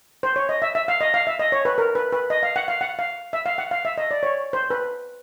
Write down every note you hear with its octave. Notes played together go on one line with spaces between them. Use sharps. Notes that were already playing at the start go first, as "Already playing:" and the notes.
C5
C#5
D#5
E5
E5
F5
D#5
F5
E5
D#5
C#5
B4
A#4
B4
B4
D#5
F5
F#5
F5
F#5
F5
E5
F5
F#5
F5
E5
D#5
D5
C#5
C5
B4